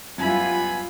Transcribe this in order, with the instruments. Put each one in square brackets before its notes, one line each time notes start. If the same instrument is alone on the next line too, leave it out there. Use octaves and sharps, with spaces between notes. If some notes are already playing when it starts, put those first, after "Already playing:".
[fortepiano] F#2 E4 [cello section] G3 F4 [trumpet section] B3 G#5 [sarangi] B5